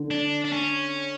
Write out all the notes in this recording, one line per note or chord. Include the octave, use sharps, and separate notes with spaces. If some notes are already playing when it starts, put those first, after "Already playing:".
Already playing: D3
D4
D4
C#4